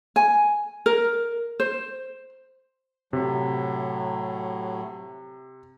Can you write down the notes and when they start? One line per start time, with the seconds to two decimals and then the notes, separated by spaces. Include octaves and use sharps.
0.16 G#5
0.86 A#4
1.60 C5
3.13 A2 C3 F#3